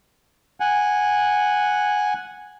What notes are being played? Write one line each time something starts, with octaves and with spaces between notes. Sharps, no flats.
F#5 G#5